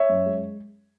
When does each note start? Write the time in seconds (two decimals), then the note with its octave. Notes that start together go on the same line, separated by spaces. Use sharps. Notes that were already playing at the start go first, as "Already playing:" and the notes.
Already playing: C#5 E5
0.09 F#2
0.26 G#3